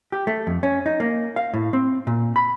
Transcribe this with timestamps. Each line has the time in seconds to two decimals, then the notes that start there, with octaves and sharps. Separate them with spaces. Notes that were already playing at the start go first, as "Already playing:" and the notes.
0.12 G4
0.27 A3
0.47 F2
0.63 C#4
0.86 D#4
1.00 A#3
1.36 F5
1.54 A2
1.73 C4
2.07 A#2
2.36 B5